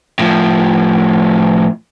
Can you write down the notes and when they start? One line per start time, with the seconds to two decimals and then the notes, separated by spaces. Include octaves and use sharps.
0.19 A2 F3